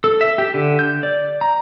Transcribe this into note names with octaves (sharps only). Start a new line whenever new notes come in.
A4
E5
G4
D3
G6
D5
A#5